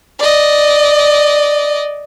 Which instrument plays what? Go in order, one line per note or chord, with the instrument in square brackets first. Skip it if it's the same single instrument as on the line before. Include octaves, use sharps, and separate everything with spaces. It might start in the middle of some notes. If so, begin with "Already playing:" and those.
[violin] D5 D#5